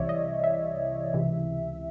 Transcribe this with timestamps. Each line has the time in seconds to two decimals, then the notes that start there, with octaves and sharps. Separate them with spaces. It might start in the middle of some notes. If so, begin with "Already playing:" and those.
Already playing: C2 C3 E3 C#5 D5 E5
0.09 D#5
0.44 E5
1.14 C#2 C3 E3